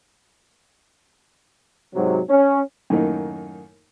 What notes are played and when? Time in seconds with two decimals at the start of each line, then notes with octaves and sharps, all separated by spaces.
1.94 G#2 C3 F#3
2.29 C#4
2.90 F#2 A2 D#3 A#3 D#4